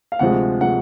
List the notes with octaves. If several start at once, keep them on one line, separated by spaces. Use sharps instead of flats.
F5
D2 C3 F3 G#3 F#5
C3 F3 G#3 F#5